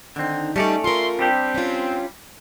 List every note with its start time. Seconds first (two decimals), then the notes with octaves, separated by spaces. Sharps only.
0.16 D3 D#3 C4 D#4
0.56 G3 A3 C#4 D#4 A4 D5
0.84 F4 A#4 E5 C6
1.19 G3 C4 D4 G4
1.55 C#4 F4